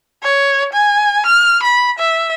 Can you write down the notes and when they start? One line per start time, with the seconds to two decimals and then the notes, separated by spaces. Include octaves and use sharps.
0.23 C#5
0.73 G#5
1.26 F6
1.63 B5
1.99 E5